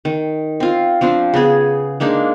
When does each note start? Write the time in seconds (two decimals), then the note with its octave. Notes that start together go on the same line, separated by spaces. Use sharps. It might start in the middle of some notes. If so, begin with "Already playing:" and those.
0.05 D#3
0.60 C4 F4
1.01 F3 C4 D4 C5
1.34 C#3 B3 G#4
2.00 G#3 A#3 D4 D#4